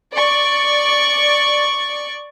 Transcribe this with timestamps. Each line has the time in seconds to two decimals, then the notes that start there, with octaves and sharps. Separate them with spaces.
0.12 D5 C#6